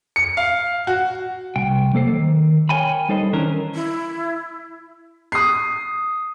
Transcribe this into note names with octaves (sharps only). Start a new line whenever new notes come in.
C#7
F5
F#4
C2 G5
F#3 A#3 A4 C5
D#3
A#4 C5 C#5 G5 G#5 B5
G3 D#4 A4 C5 D#5
D#3 E3 C#4 D4 A#4
E4
D#6 C7